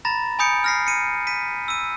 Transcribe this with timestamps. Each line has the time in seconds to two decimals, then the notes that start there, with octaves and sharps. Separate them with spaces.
0.05 A#5 B5 A6 A#6
0.39 G#5 B5 D#6 G6 C#7 D7
0.64 F6 A#6 C7
0.87 C#7 D#7
1.27 B6 D#7
1.68 E6 D#7